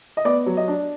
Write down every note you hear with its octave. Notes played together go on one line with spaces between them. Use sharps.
D#5
B3 D5
F#3
D#5
D4